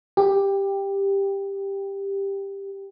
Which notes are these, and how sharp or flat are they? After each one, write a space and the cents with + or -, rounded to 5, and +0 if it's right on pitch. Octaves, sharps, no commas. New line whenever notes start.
G4 +10